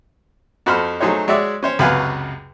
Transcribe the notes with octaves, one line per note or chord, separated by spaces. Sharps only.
F2 F#4 A4 C5 B5 F6
F#3 A3 D#4 G#4 C5 C#5
G#3 F#4 C#5 D5 E5
C#4 C5 C#5
C#2 F#2 C3 B4 F5 G#5